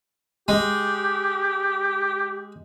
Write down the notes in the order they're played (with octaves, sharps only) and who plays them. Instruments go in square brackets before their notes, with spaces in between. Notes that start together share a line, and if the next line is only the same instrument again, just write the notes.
[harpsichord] G#3 [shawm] G4